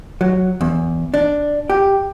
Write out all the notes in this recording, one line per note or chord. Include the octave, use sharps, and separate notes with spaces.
F#3
E2
D4
G4